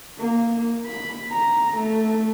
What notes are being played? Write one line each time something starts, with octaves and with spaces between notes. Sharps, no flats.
A#3
B5
A#5
A3